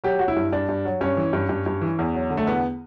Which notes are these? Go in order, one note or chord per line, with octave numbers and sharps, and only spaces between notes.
F#3 G4
F#3 F#4
E4
G2
G2 D4
G2
F#3
G2 C#4
E3
G2
G2
G2
E3
E2
F#3
D3
A3
E2 B3